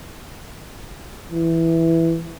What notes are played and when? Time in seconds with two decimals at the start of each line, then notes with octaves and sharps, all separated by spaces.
1.31 E3